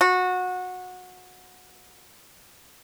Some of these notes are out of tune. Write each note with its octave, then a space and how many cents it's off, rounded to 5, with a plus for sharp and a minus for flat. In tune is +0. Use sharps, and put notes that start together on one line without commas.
F#4 -20